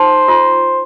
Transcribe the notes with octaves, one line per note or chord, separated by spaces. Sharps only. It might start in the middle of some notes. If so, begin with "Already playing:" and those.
Already playing: D#4 C5
F4